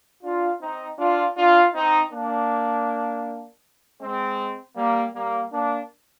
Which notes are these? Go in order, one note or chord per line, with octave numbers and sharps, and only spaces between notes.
D4 F4
C4 D#4
D4 F4
D4 F4
C4 D#4
A#3 D4
G#3 C4
G3 A#3
G3 A#3
A#3 D4